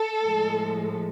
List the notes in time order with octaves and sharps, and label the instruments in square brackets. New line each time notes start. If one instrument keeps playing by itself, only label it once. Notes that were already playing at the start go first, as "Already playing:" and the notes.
Already playing: [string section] A4
A2 F3 G#3